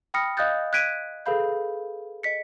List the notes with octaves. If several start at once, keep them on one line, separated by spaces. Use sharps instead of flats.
G5 B5 D#6 F6 A#6 C#7
D#5 F5 D#6 F#6 G6 A6
F#6 G#6 B6 D7 D#7
G#4 A4 B4 F5 B5 G6
D#5 B6 C#7